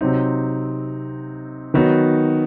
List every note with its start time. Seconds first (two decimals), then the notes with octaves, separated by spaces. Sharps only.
0.01 C3 F#3 C4 D#4
1.74 D#3 F#3 B3 D#4 F#4